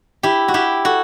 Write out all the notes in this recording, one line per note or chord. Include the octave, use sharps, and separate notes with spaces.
E4 G4
F#4
E4 G4
F#4 A4